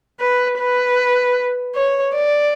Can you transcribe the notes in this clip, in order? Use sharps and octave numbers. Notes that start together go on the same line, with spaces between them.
B4
B4
C#5
D5